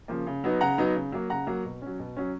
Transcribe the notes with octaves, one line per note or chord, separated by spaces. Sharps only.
C#3 F3 A#3
C#3
F#3 B3 D#4
C#3 F#5 A#5
F#3 B3 D#4
C#3
F#3 A#3
C#3 F#5 A#5
F#3 A#3
B2
F#3 C#4
B2
F#3 C#4